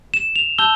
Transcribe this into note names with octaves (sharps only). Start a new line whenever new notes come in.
E7
F7
A5 E6 G6 G7